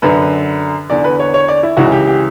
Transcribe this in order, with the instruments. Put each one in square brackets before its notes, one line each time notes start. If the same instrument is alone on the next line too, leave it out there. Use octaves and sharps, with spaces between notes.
[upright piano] F#2 D3 B4
E2 D3 D5
B4
C#5
C#5
D5
E4
C#2 C#3 E3 F#4
G4
G4